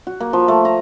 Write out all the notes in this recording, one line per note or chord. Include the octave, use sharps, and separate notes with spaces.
F#4
A#3
F3
A3
A#5